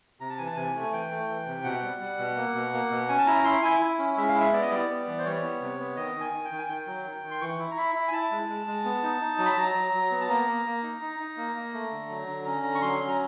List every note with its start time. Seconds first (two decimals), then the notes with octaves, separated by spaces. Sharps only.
0.20 C3 A#5
0.30 A5
0.38 E3 G#5
0.46 A5
0.56 C3 G#5
0.75 A3
0.81 G#5
0.92 E3 G5
1.10 A3
1.29 E3
1.46 C3
1.64 B2 F#5
1.82 G3
2.01 G3
2.18 B2
2.37 A#3
2.55 B2
2.73 A#3
2.91 B2
3.09 C#4 G#5
3.18 A5
3.26 E4 A#5
3.44 E4 C6
3.62 E4 G#5
3.80 E4
3.99 C#4
4.17 G#3 E5
4.29 F5
4.34 E4
4.40 E5
4.53 B3 D5
4.62 D#5
4.71 G3 D5
4.89 B3
5.07 E3
5.19 C5
5.25 G3 C#5
5.43 B3
5.61 C3
5.79 B3
5.96 D#3 D#5
6.15 D#3
6.20 G#5
6.33 D#3
6.45 G5
6.51 D#3
6.58 G#5
6.69 D#3 G5
6.87 F#3
7.05 D#3
7.23 D#3
7.31 C6
7.41 E3 C#6
7.59 E4
7.71 A#5
7.77 E4 B5
7.95 E4
8.08 G#5
8.13 E4 A5
8.31 G#3
8.49 G#3
8.67 G#3
8.85 B3
9.03 D#4
9.21 D#4
9.38 F#3
9.46 B5
9.56 F#3 A#5
9.75 F#3
9.93 F#3
10.11 B3
10.21 A5
10.29 A#3 A#5
10.48 A#3
10.65 A#3
10.83 D#4
11.01 D#4
11.20 D#4
11.37 A#3
11.56 A#3
11.74 A3
11.92 D3
12.09 F#3
12.27 D3
12.45 C#4 A#5
12.63 D3 A#5
12.75 C#6
12.81 F#3 C6
13.00 C#4
13.08 A#5